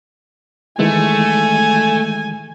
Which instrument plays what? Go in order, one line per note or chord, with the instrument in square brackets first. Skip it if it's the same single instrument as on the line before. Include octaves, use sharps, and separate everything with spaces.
[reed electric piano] D#3 E3 G#3 [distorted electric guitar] A3 [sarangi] G#5